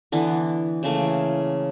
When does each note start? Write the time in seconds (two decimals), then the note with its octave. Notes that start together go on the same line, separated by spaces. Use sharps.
0.12 D3 E3 B3
0.83 C#3 E3 A3 A#3